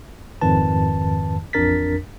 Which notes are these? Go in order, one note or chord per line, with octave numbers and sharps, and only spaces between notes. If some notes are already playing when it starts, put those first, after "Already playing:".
F2 G#2 D#3 B4 A5
A1 F2 D4 A#4 A6 B6